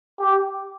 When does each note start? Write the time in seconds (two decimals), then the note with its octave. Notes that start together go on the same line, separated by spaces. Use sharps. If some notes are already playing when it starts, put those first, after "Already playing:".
0.20 G4